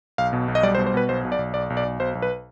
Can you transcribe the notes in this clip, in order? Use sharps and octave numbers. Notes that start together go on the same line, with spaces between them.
B1 F5
B2
B1
D#5
G3 D5
C5
B2
C5
B2 B4
B1 C5
B1
D5
B1
B1 D5
B1
D5
B1
B1 C5
B1
B4